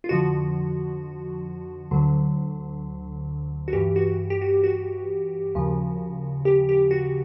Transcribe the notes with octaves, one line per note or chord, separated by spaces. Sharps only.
F4
F2 D3 F3 F#4
D2 D3 F#3
F#4
G2 E3 G4
F#4
G4
F#4
F#4
D#2 C#3 F3
G4
G4
F#4